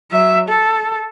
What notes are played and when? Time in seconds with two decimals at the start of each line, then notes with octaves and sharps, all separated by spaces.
0.11 F#3 E5
0.48 A4